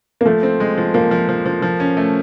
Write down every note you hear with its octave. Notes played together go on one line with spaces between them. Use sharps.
A#3
F3 A3
C4
G#3
F3
F3 A#3
F3
F3
F3
F3
C#4
A3